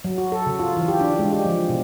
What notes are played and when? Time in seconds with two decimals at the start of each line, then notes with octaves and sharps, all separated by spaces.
0.04 F#3
0.18 F#4
0.32 A4
0.46 C#3
0.59 F4
0.77 E3
0.88 G4
1.01 D4
1.19 G#3
1.33 G4
1.45 F3
1.69 B2